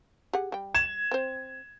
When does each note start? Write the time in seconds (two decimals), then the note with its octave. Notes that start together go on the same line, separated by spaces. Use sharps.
0.33 G4 G#4 F#5
0.52 G3 G5
0.75 G#6 E7
1.11 C4 C5